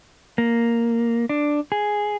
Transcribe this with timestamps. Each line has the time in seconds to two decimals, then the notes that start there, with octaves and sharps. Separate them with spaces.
0.38 A#3
1.29 D4
1.72 G#4